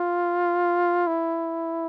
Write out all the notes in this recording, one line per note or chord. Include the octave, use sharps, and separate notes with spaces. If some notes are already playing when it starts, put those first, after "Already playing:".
Already playing: F4
E4